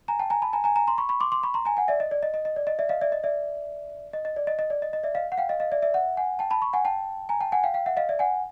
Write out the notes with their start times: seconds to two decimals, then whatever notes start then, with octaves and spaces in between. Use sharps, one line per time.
0.08 G#5 A#5
0.19 G5 A5
0.30 G#5 A#5
0.42 A5 B5
0.53 G#5 A#5
0.64 G#5 A#5
0.76 G#5 A#5
0.87 A#5 C6
0.98 B5 C#6
1.09 B5 C#6
1.20 C6 D6
1.32 C6 D6
1.43 B5 C#6
1.54 A#5 C6
1.65 G#5 A#5
1.77 F#5 G#5
1.88 D5 E5
2.00 D#5
2.11 D5
2.23 D#5
2.34 D#5
2.45 D#5
2.56 D5
2.67 D#5
2.79 D5 E5
2.89 D#5 F5
3.01 D5 E5
3.12 D#5
3.24 D5 E5
4.13 D#5
4.25 D#5
4.36 D5
4.47 D#5
4.59 D#5
4.70 D5
4.82 D#5
4.93 D#5
5.04 D5 E5
5.15 D#5 F5
5.32 F#5
5.38 F5 G5
5.49 D#5 F5
5.60 D#5 F5
5.72 D5 E5
5.82 D5 E5
5.94 E5 F#5
6.17 F#5 G#5
6.39 G5 A5
6.51 A5 B5
6.62 B5 C#6
6.73 F#5 G#5
6.85 G5 A5
7.29 G#5 A#5
7.41 G5 A5
7.52 F#5 G#5
7.64 F5 G5
7.74 F5 G5
7.86 E5 F#5
7.97 D#5 F5
8.09 D5 E5
8.19 F#5 G#5